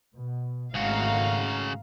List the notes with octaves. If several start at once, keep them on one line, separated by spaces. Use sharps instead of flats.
B2
G#1 C#3 A3 F#4 F5 A#5